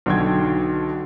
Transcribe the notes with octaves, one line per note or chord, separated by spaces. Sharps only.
B1 D3 F#4 G5 G#6